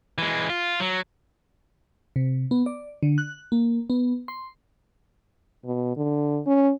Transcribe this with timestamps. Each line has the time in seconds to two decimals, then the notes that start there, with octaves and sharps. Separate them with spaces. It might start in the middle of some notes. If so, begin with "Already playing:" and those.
0.18 E3 G#3
0.50 F4
0.80 F#3
2.16 C3
2.51 B3
2.66 D5
3.03 D3
3.18 F#6
3.52 A#3
3.90 B3
4.28 C6
5.65 B2
5.97 D3
6.47 C#4